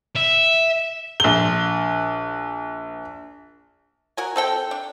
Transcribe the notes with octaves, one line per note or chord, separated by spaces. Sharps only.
E5
A#1 G7
F#4 A#4 G#5
C4 A4 G5
D4